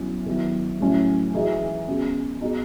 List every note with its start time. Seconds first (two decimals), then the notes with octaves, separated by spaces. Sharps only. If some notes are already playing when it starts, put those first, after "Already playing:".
Already playing: B2 F#3 C#4 E4
0.26 D#3 F#3 B3 E4
0.81 A2 F#3 C#4 E4
1.34 E3 G#3 D#4 F#4
1.87 B2 G#3 C#4 F#4
2.41 B2 G#3 D#4 F#4